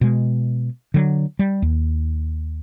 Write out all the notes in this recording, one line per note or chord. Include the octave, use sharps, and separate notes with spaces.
B2 G#3
D3 F#3
G3
D#2